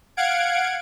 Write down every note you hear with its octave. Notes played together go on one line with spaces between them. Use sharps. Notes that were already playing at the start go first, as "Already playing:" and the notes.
F5 F#5 G#6 D7